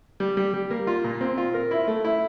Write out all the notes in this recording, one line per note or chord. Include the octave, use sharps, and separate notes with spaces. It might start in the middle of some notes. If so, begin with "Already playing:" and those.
G3
G3
G3
A#3
F4
A#2
C4
F4
A#4
E4
A3
E4